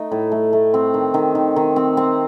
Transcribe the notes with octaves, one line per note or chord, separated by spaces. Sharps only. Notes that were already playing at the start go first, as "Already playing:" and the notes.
Already playing: A3 D#4
A2
A3
A3
C4
D#3
D#3
D#3
D#3
C4
C4